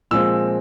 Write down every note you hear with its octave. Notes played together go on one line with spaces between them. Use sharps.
A#2 F3 G#3 C4 F4 E6